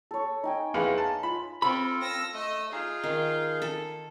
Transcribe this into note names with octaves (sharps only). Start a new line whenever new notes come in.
A4 C#5
D#4 G5 G#5
E2 B4 F5 F#5 C6
A5
F4 B5
C4 F4 A4 B5
E6 A#6
A3 D#5 E6
D#4 F4 G#4 F5
D#3
A4